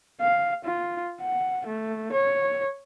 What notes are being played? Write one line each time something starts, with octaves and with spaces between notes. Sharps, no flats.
F5
F4
F#5
A3
C#5